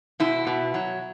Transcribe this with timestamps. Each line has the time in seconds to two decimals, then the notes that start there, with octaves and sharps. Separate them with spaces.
0.20 B2 E4
0.47 B2
0.74 F#3